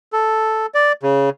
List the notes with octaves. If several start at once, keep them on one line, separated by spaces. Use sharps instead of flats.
A4
D5
C#3